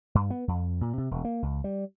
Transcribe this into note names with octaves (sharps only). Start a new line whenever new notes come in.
G2
B3
F2
A#2
C3
E1
A#3
C#2
G3